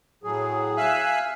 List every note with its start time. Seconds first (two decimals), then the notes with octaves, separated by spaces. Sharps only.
0.24 A2 F#3 G#4
0.77 E5 F5 G#5 E6 F#6